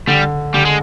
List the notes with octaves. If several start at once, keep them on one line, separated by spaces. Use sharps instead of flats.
D3 G3
D3 G3
G#3